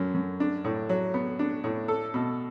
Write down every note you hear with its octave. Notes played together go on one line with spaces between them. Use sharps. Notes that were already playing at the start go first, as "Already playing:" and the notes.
Already playing: F#2 D3 F#3
F#2
D4
A2
F#3
B3
D4
A2
A4
B2